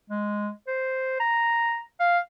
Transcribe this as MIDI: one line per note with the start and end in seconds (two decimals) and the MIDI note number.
0.10 0.49 56
0.67 1.16 72
1.20 1.80 82
2.00 2.19 77